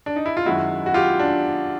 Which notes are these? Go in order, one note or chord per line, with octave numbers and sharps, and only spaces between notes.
D4
D#4
E4
F4
F#2 D#3 G#3 E4 F#4
F#4
F4 G4
D4